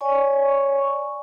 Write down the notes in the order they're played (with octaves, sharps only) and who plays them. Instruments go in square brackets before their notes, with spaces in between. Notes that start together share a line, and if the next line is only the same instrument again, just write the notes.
[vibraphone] C#5 D5 G#5 C#6